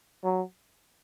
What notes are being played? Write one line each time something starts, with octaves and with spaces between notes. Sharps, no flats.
F#3